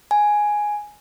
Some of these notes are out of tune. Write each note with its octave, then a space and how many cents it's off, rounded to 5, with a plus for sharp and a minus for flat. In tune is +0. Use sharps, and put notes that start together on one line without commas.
G#5 +5